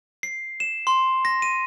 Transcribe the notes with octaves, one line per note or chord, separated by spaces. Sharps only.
C7
E7
C6
A#6
D#7